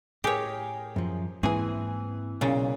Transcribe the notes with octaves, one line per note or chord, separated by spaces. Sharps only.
A2 G4 G#4 A#4 C#5
F#2 F3
G#2 E3 G#3 A#3 C4 G#4 G#5
B1 A#2 C#3